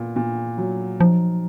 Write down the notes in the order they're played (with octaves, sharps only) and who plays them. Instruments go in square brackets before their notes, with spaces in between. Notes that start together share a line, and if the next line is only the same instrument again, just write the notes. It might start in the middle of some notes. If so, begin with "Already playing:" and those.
Already playing: [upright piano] A#2 B3
A#2
F#3
[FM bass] F3 [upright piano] D#4